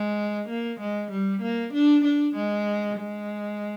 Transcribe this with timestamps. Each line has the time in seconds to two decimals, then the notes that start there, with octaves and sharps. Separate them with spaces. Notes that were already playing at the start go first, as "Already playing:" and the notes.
Already playing: G#3
0.49 A#3
0.80 G#3
1.12 G3
1.42 A#3
1.73 D4
2.04 D4
2.36 G#3
2.98 G#3